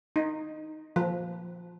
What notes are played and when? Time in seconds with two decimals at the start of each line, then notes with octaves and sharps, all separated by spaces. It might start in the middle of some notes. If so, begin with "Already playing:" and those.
0.16 D#4
0.96 F3